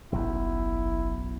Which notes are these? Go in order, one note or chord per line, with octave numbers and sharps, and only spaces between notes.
F#1 B1 F#2 E4